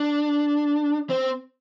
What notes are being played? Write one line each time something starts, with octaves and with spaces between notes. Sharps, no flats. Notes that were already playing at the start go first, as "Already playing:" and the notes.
Already playing: D4
C4